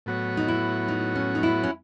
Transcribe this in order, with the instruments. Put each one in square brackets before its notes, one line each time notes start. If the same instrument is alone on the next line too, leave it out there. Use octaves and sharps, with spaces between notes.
[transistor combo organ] A2 F#3 B3 F#4 C#5
[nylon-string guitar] D#4
E4
D#4
C#4
D#4
E4
C#4